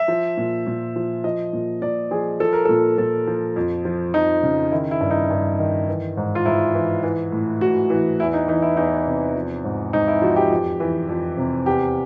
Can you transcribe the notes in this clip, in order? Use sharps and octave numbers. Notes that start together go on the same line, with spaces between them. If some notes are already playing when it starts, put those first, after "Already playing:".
Already playing: E5
F3
A#2
A#2
F3
F3 D#5
A#2
A#2 D5
F3 G#4
F3 A4
A#4
A#2 A4
A#2 A4
F3
F2
F3
F2 D#4
C#3
D#3 E4
E4
G2
D#4
G2
D#3
E3
G#2
F4
G#2 E4
E3
E3
A2
A2 F#4
E3
E2 E4
D#4
E3 D#4
E4
E2 D#4
C3
F3
G#2
G#2 D#4
E4
F3 F#4
G4
F2
E3
F2
C3
E2 G4